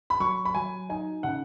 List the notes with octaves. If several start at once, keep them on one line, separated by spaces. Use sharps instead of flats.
B5
F#3 C#6
B5
F#3 G#5
D#4 G#5
C#3 F#5